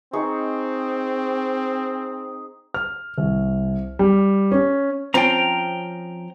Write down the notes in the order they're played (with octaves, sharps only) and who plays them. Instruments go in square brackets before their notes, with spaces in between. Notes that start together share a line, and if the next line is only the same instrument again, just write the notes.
[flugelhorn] C4 [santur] D#4 G#4 C#6
[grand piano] F6
C2
G3
C#4
[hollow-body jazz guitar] F3 C4 C#4 [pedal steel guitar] G5 A#5